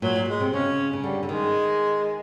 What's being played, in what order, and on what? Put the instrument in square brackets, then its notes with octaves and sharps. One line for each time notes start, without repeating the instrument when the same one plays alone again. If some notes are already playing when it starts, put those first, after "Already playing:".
[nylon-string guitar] A#2 [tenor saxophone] F#3
[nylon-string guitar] A#2
[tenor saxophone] G#3
[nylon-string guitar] C3
[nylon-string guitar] C#3 [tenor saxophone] C#4
[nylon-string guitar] C#3
[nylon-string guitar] D3 [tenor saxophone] G3
[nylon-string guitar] D3
[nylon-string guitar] D#3 [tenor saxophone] G#3